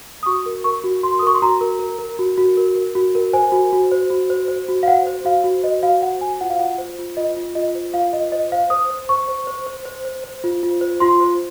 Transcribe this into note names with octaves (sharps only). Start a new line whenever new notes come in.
D#6
F#4 C#6
A#4
A#4 C#6
F#4
F#4 C6
D#6
A#4 C#6
C6
F#4 A#5
A#4
A#4
A#4
F#4
F#4
A#4
A#4
F#4
A#4
C5 G#5
F#4
F#4
C5
F#4
C5
C5
F#4
F5
C5 F#5
C5
F#4 F5
F#4
C5 D#5
F#4 F5
C5 F#5
F#4 G#5
F4 F#5
F5
F4 F#5
C5
F4
F4 D#5
F4
F4 D#5
C5
F4 F5
F4 D#5
C5 D#5
C5 F5
C5 D#6
C5
C5 C#6
C5
C5
C5
C5
C5
C5
F4
F4
C5
F4 C6
C5